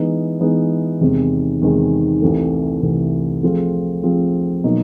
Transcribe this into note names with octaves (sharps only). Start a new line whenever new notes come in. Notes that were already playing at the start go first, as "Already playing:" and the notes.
Already playing: E3 G#3 B3 D#4
E3 G#3 B3 D#4
E2 C3 D#3 G#3
E2 C3 D#3 G#3
C2 C3 E3 A3
C2 C3 E3 A3
F3 A3 C4 F4 G#4
F3 A3 C4 F4 G#4
B2 F#3 A#3 D#4